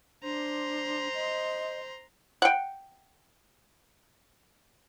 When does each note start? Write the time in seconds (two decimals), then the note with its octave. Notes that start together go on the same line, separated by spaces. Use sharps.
0.23 D4 C5 A#5 C6
1.14 D#5
2.42 F#5 G5